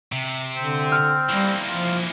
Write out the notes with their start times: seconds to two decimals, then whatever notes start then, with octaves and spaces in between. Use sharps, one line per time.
0.12 C3
0.57 D3 C4
0.92 F6
1.29 E3 G3 A#3
1.69 F3 F4